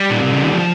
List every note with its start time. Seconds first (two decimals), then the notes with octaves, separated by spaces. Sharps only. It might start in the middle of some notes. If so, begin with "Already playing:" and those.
Already playing: G3
0.10 A#2
0.21 C3
0.32 C#3
0.43 D#3
0.54 F3